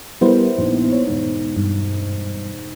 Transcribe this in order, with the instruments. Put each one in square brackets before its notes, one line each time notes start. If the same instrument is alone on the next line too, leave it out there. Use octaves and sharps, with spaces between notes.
[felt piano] G3 A#4 [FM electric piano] B3 E4 C5
[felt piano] A#1 D#4
C#5
E1 G#2
[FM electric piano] G2